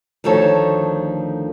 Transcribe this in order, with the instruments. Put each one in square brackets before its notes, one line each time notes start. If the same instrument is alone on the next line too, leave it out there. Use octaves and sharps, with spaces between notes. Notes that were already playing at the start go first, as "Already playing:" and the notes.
[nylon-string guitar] D2 D#3 F3 A4 C#5